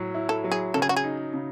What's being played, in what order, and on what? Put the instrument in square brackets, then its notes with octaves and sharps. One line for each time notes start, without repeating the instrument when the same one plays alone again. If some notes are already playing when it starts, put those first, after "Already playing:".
Already playing: [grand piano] A2 F#3
E4
[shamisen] A4
[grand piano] F#3
[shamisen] G#4
[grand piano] C#3 [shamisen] A4
[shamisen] G#4
F#4
G#4
[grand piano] D#4
C#3